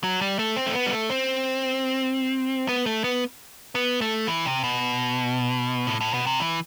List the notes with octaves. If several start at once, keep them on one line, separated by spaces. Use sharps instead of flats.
F#3
G3
A3
C4
A3
B3
G3
A3
C4
B3
A3
B3
B3
A3
E3
C3
B2
A2
A2
B2
C3
E3